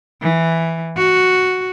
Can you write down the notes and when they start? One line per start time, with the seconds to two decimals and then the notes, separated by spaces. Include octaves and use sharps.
0.22 E3
0.96 F#4